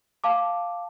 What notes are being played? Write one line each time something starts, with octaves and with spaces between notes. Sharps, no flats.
F5 A5 D6